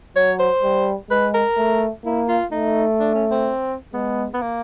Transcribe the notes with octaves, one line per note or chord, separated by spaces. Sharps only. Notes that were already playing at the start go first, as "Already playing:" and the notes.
F#3 C#5
C5
G3
G#3 B4
A#4
A3
A#3 E4
F4
A3 D#4
D4
C#4
C4
G#3 B3
B3
A#3